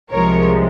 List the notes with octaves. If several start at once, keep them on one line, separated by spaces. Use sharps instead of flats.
C2 C3 F3 G#3 A#4 C#5